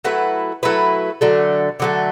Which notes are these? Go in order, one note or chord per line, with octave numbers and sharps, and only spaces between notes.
F#3 A3 E4 B4
F#3 A3 E4 B4
D3 F#3 A3
D3 F#3 A3